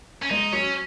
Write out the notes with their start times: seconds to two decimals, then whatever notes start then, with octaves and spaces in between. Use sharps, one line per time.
0.23 C#4
0.30 G#3 D#4
0.52 F#3 C#4